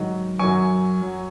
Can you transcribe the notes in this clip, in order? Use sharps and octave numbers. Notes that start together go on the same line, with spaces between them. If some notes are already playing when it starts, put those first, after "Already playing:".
Already playing: G#2 D#3 F#3
F#2 F#3 G#5 C#6
F#3